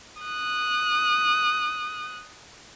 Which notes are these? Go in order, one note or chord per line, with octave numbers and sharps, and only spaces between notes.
D#6 F#6